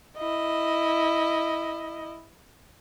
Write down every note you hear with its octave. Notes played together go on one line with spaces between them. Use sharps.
E4 D#5